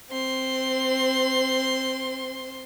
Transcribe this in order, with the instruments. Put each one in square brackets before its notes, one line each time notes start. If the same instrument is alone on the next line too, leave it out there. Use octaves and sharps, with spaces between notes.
[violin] C4 C6